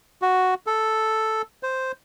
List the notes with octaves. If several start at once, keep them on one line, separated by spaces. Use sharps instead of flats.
F#4
A4
C5